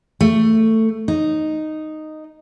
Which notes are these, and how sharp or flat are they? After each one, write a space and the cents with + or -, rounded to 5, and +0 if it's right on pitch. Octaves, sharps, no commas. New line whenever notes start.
A3 +15
D#4 -5